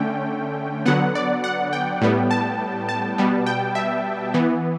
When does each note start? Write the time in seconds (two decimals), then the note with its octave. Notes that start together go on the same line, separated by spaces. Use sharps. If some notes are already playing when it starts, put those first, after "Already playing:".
Already playing: D3 A3 C#4 G5
0.86 D3 F#3 B3 F#5
1.15 D5
1.44 F#5
1.73 G5
2.02 A2 G3 B3
2.31 A5
2.89 A5
3.18 B2 G3 B3
3.46 G5
3.75 E5
4.34 E3 B3